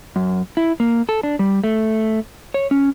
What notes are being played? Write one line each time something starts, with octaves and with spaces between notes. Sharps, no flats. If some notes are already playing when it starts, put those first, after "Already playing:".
F#2
E4
A#3
A4
D4
G3
A3
C#5
C#4